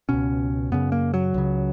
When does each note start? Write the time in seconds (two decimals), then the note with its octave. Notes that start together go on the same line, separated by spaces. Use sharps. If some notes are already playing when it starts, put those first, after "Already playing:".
0.09 C#2 B2 C#4
0.72 F#2 C#3 B3
0.92 A#3
1.14 F#3
1.34 C#2 C#3